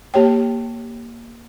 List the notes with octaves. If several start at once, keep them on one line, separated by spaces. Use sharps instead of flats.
A#3 G4 C#5 G5